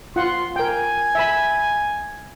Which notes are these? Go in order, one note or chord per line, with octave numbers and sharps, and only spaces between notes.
F4 F#5 C6
A#4 G5 G#5
E5 B5